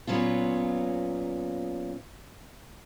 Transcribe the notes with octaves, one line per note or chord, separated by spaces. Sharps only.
A#2 F#3 B3 C#4 F4